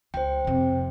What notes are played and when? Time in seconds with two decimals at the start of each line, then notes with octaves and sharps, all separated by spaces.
0.14 C#2 C5 G5
0.44 F2 C3